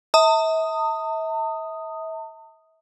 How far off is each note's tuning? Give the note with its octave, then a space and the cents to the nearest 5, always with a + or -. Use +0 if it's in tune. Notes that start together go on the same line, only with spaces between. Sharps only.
E5 -40 A5 +45 D#6 +0